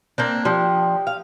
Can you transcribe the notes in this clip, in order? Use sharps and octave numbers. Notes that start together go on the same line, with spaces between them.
A#3 C4 D4
F3 D4 G4 G5 D#6
F5